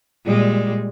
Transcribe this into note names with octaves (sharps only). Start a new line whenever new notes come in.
A#2 G3 G#3